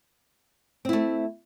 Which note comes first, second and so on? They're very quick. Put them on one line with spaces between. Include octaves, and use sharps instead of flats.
C4 E4 A3